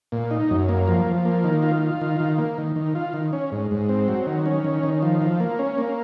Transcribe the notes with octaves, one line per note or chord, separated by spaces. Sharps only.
A#2
D#4
F#2
A#3
F3
F3
A#3
D#3
F4
F4
D#3
D#3
A#3
D#3
D#3
F4
D#3
C#4
G#2
G#2
C4
F#3
D#3
C#4
D#3
D#3
F3
F3
A#3
C#4
A#3